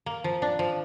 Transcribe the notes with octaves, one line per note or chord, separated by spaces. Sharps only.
A#3
F3
D4
F3